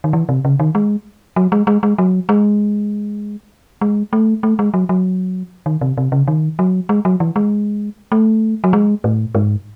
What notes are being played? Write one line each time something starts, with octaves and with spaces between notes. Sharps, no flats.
D#3
E3
C3
C#3
D#3
G#3
F#3
G#3
G#3
G#3
F#3
G#3
G#3
A3
A3
G#3
F#3
F#3
D#3
C3
C3
C#3
D#3
F#3
G#3
F#3
E3
G#3
A3
F#3
G#3
A2
G#2